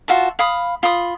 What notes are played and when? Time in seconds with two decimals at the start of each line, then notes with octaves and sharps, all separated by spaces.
0.08 F4 F#4 E5 A5
0.39 F5 B5 D#6
0.83 F4 B5 D#6